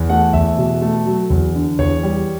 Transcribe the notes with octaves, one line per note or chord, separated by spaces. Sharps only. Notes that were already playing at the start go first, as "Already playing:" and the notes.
Already playing: E2
A3 F#5
E2 E5
B2
A3
F#3
E2
D3
E2 C#5
G3